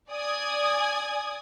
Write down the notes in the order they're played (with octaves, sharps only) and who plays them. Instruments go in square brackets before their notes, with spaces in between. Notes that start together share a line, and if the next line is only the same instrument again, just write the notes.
[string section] D5 G#5 D#6 G#6